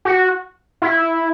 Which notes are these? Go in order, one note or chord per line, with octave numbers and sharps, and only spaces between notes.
F#4
E4